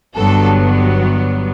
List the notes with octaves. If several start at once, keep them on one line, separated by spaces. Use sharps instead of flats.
G1 G2 F#3 B3 A4